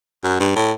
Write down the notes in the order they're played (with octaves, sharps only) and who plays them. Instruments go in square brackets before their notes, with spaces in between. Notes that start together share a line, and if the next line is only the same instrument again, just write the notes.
[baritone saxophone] F#2
G2
A2